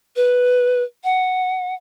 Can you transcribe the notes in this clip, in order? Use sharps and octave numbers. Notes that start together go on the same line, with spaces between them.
B4
F#5